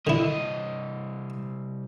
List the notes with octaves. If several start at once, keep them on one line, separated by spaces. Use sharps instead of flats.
C2 D3 E4 D#5